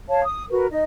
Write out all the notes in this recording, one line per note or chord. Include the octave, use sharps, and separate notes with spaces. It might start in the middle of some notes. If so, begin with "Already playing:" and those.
C#5 F5 A5
D#6
F#4 A#4 B4
D#4 D#5